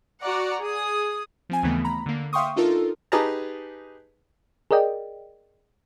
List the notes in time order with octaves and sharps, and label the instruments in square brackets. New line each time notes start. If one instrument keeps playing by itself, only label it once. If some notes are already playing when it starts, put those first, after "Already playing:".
[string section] F#4 D5 F#5 A#5
G#4 D#6
[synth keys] F3 C4 G#5
D#2 C#3 E3 A3 B3
A#5 B5
D3 A#3
E5 F5 G5 C6 C#6 D#6
D4 D#4 F4 A4 A#4
[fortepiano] D#4 G4 G#4 B4 A5 A#5
[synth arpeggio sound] G#4 A#4 D5 D#5 G5